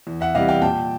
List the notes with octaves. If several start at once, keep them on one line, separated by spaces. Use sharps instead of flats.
E2
E5 F#5
C3 E3 G3 D#5 F5
F5 G5
A#2 G5 A5